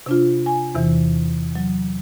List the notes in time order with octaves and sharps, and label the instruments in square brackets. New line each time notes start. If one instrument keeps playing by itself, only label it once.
[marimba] C3 D4 F4
G#5
E2 C3 E3
F#3